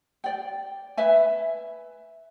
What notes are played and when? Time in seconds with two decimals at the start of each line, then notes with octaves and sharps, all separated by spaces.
0.24 D5 G5
0.97 B4 E5 G#5